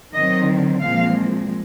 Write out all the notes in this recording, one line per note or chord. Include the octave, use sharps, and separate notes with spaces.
D#3 F#3 C4 D#5
A#2 F3 G#3 C4 F5